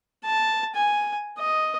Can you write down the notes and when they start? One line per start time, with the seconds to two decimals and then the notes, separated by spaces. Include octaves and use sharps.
0.25 A5
0.76 G#5
1.39 D#5